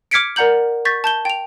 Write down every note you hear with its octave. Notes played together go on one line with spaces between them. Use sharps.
D6 F6 G#6 B6 C#7 D7
A#4 D5 F#5 A#5 G6 F#7
C#6 G6 A6 B6
A5 G6 G7
G5 F7